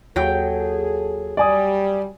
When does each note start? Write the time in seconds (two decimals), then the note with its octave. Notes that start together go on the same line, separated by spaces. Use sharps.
0.16 D#2 F#3 G#4 A4 G5
1.37 G3 D5 G#5 D#6